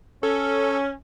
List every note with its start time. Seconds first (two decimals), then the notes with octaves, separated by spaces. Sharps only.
0.23 C#4 A4